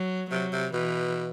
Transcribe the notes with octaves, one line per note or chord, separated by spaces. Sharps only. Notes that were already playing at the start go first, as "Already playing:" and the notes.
Already playing: F#3
C3 F#3
C3
B2 E3